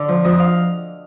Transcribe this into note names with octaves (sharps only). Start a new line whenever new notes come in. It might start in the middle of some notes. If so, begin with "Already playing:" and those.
Already playing: D3 D5
F3
F2 D#5
F5